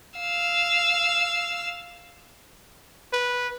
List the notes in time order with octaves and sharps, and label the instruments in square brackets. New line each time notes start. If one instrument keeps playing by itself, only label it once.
[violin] F5 E6
[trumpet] B4